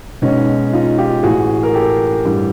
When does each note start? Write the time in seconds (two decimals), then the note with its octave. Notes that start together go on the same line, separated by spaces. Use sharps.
0.22 B1 B2 G#3 C#4 D#4
0.73 D#4 F4
0.98 F4 G4
1.23 A1 A2 E3 F#4 G#4
1.63 A#4
1.74 G4 A4
2.25 A1 G2 E3 G3